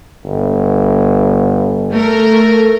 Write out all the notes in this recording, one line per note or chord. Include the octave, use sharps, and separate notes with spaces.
G1
A3 A#4